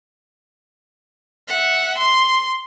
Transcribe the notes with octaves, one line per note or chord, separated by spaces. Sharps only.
E5 F#5
C6